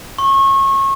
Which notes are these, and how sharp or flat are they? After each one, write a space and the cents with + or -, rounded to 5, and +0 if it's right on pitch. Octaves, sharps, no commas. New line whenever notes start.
C#6 -30